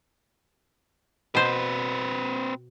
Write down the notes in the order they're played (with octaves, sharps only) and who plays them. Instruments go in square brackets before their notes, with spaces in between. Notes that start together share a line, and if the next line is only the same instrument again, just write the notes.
[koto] B2 C5 [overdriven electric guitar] C4 B4